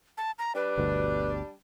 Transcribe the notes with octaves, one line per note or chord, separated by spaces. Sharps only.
A5
A#5
G3 D4 B4
G1 D2 B2